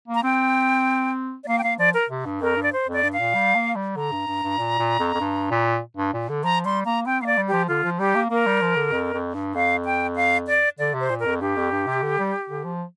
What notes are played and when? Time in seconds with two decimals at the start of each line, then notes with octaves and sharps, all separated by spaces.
0.08 A#3
0.15 A#5
0.23 C4 G5
1.44 D5
1.48 A#3 F5
1.58 G5
1.63 A#3 F5
1.79 F3 D5
1.94 A#4
2.09 C3
2.25 G2
2.41 F2 A#4
2.56 G2
2.63 D5
2.73 C5
2.87 F2
2.93 D5
3.03 G2
3.13 F5
3.19 A#2
3.35 G3
3.55 A#3
3.75 G3
3.96 D3 A#5
4.11 G2
4.27 G2
4.43 G2
4.58 A#2
4.79 A#2
4.99 F2
5.14 F2
5.20 G2
5.51 A#2
5.97 G2
6.13 A#2
6.29 D3
6.44 F3 A#5
6.65 G3 C6
6.85 A#3 A#5
7.06 C4 G5
7.22 A#3 F5
7.26 D5
7.37 G3
7.48 F3 G4
7.68 D3 F4
7.84 F3
7.99 G3 G4
8.15 A#3
8.30 A#3 A#4
8.46 G3
8.61 F3
8.76 D3
8.92 F2
9.14 F2
9.34 G2
9.54 F2 F5
9.85 G5
10.16 F5
10.47 D5
10.79 D3 D5
10.94 C3
11.00 C5
11.10 A#2
11.20 A#4
11.25 F2
11.40 G2 G4
11.57 F2
11.72 G2
11.87 C3
12.02 D3
12.19 G3
12.50 D3
12.65 F3